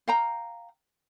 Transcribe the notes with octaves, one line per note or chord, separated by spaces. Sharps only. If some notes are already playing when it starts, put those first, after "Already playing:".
F5 G5 A#5